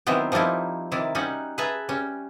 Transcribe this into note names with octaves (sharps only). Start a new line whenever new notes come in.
D#3 E3 F#3 B3 C4
F3 G3 A#3 D#4 E4
C3 D#3 E4 D5
G3 C#4 D#4 F#4
G#4 B4 E5 A5 A#5
G3 C#4